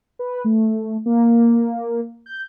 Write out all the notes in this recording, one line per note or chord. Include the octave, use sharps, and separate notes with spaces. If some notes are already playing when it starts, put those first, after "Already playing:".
B4
A3
A#3
G6